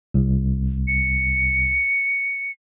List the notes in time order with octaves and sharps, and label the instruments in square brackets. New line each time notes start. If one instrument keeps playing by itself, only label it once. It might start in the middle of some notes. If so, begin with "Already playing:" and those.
[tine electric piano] C2
[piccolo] C#7